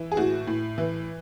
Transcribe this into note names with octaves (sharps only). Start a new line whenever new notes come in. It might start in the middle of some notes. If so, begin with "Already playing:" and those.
Already playing: E3
G#4
A2 F#4
A2
E3